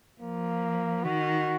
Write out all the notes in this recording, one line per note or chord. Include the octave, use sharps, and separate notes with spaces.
F3 A#3
D#3 F#4